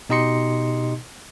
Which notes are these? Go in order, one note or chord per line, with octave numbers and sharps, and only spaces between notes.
B2 D#4 G4 D#5 C6 C#7